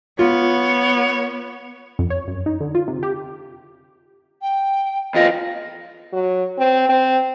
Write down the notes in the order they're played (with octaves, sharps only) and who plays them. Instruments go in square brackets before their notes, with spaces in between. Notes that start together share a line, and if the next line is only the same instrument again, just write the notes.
[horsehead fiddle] B3 [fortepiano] F4 [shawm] C#5
[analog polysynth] F2
C#5
F#2
D#4
D3
F4
C3
G4
[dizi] G5
[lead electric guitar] E2 F4 [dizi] D#5
[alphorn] F#3
C4
C4